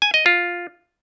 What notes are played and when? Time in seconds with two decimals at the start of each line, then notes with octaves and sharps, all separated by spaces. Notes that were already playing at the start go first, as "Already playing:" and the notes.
0.02 G#5
0.14 D#5
0.26 F4